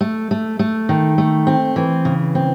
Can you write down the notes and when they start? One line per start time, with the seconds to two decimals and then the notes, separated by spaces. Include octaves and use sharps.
0.01 A3
0.31 A3
0.59 A3
0.89 D#3
1.18 A3
1.47 C4
1.76 E3
2.05 C#3
2.35 C4